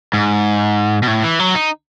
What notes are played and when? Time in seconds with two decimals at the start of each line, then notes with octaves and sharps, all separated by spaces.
0.13 G#2
1.03 B2
1.08 A2
1.23 E3
1.39 F#3
1.55 D#4